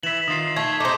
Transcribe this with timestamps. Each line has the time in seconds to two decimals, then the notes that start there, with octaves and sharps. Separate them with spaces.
0.03 E3 E5 E7 F#7
0.28 D#3 F4 D#6 C7
0.56 A3 G#6 B6
0.80 A3 D#4 C5 D6